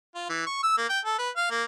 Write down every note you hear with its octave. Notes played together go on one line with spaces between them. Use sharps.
F4
E3
C#6
E6
A#3
G5
A4
B4
F5
A#3